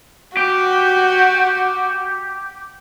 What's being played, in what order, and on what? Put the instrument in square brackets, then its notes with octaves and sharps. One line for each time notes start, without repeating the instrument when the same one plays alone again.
[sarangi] F#4 [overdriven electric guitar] G4